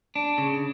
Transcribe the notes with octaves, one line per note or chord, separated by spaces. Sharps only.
D4
C#3